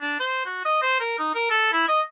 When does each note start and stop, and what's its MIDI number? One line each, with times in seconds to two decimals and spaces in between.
0.01 0.15 62
0.20 0.44 72
0.46 0.62 66
0.65 0.79 75
0.82 0.99 72
1.00 1.16 70
1.19 1.30 63
1.35 1.49 70
1.50 1.72 69
1.73 1.86 64
1.88 2.01 75